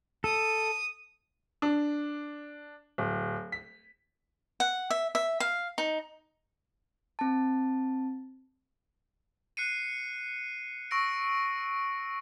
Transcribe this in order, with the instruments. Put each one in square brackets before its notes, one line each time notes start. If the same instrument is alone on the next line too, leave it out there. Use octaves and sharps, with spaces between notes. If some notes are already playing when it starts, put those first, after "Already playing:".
[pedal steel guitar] A4 [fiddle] D#6
[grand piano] D4
D1
B6
[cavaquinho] F#5
E5
E5
F5
D#4
[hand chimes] C4 A5
[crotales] F#6 C7 C#7 D#7
C#6 E6 A#6 D7